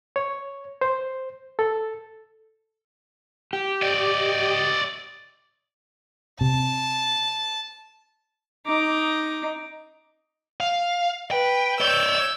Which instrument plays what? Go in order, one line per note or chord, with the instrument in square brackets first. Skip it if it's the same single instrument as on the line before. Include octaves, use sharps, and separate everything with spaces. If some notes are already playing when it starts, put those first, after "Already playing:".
[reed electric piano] C#5
C5
A4
[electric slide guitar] G4
[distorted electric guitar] D5 D#5
[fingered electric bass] C3 [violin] A5
[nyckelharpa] D#4 D6
[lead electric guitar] F5
[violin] B4 [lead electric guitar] G5
[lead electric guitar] C#5 D5 [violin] E6 G6